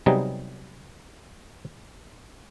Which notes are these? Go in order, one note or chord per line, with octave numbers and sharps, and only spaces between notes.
C3 F#3 G3 B3 D#4 G#4